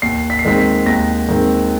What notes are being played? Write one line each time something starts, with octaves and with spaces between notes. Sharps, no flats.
D#2 C7
B6
C7
D#3 G#3 C4 B6
B6
D#2 A#6
D#3 G#3 C4